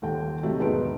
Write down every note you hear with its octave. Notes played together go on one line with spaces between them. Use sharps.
D#1 D#2 G5
C3 D#3 F#3 A3
E1 G#2 B3 D#4 A5 D7